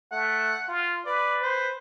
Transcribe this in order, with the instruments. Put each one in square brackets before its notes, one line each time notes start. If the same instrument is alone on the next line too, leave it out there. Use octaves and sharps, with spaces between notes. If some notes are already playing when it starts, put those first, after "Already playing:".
[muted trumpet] A3 [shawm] F#5
[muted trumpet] F4
[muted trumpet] B4 [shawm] D5
[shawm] C5